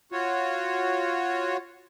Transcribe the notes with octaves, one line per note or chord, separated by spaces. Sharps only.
F4 F#4 C#5